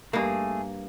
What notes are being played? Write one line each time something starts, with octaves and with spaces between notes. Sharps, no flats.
G2 A3 A#3 G#4